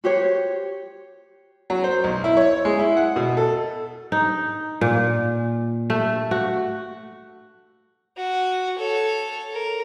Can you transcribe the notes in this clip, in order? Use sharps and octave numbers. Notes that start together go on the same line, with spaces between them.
F#4 G4 C5 C#5
F#3
C5
B1
E4
C#5
G#3
E4
F#5
B2
A4
D#4
A#2
A3
F#4
F#4
A4 C#5
A#4